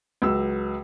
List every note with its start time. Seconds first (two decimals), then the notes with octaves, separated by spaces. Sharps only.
0.22 C#2 F#3 E6